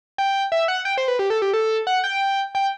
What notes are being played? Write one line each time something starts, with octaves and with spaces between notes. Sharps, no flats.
G5
E5
F#5
G5
C5
B4
G4
A4
G4
A4
F#5
G5
G5